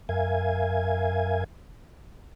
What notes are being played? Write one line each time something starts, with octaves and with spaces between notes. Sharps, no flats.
F#2 A#4 E5 F5 G#5 G#6